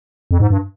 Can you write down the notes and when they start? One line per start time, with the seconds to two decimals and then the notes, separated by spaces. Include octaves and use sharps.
0.31 F2
0.40 G#2
0.50 G2